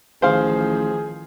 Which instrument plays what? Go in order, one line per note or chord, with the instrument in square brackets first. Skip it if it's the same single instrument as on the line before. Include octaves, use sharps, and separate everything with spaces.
[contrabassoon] A1 [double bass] D#3 F3 [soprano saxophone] G#4 [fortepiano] C5 F5